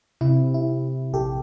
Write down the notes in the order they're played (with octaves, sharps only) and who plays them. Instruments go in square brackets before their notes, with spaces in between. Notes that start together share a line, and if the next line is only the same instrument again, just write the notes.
[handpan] C3 [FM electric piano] E4
[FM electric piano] E4
A#1 G4 A4